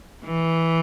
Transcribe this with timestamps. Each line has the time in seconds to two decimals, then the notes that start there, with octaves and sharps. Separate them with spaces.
0.25 E3